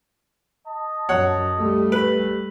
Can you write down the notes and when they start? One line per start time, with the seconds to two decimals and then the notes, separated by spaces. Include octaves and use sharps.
0.68 D#5 A5
1.09 F#2 C#5 F#5
1.57 G3 A3
1.92 B4